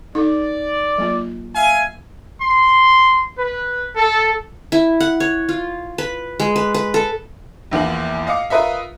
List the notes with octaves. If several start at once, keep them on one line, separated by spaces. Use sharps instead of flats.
D#4 A4 D5
F#3 A#3 F4
E5 F5 G#5
C6
B4
A4
E4
F#5
C#5
F4
B4
G#3
B4
B4
A4
A#1 E2 A#3 F#7
D#5 F5 D6 C#7
F4 A#4 B4 D#5 E5